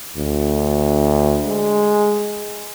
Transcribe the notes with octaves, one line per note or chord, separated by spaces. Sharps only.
D2
G#3